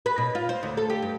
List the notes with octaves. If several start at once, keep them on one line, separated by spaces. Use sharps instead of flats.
B4
B2
F4
C5
D2
A4
G4
G2